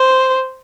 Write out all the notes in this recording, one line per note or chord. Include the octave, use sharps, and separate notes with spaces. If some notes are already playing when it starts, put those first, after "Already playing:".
Already playing: C5